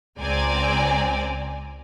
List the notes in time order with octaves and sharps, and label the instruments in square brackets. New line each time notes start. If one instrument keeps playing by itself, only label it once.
[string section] C#2 C4 D5 G#5 A#5